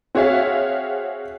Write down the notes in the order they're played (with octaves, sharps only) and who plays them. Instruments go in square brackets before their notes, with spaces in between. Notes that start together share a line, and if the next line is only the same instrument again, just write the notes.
[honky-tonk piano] C4 F#4 G#4 C#5 E5 F5